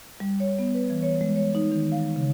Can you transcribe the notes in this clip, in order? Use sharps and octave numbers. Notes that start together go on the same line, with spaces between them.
G3
C#5
B3
B4
E3
C#5
G#3
C#5
D#4
D#3
F5
C#3